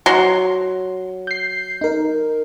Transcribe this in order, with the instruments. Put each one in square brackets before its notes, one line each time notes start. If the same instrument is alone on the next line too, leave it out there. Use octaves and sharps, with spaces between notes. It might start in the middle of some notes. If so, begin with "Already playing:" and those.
[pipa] F#3 C6
[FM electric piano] G6 C7
D#4 A#4